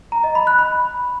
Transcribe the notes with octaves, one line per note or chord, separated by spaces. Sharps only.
A#5
D#5
B5
F#6
B5